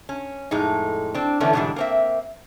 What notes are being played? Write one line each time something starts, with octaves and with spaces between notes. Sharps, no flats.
C#4
F2 A2 G#3 D#4
C4 D4
D3 E3 A3 B3 C#4 D4
G#2 B2 D3 E3 G3 D4
A#3 C4 E5